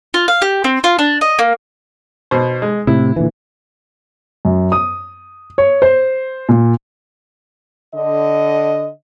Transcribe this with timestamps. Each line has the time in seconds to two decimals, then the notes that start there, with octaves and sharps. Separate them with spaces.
0.14 F4
0.28 F5
0.42 G4
0.64 C4
0.84 F4
0.99 D4
1.21 D#5
1.39 A#3
2.31 B2 C5
2.62 G#3
2.87 A2 C3 E4
3.16 A#2 D3 E3
4.45 F#2
4.72 D#6
5.58 C#5
5.82 C5
6.49 A#2
7.95 D3 D#5